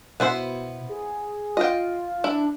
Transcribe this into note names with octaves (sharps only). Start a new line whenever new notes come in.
B2 B3 E4 C5
G#4
F4 D#5 G5
D4 E4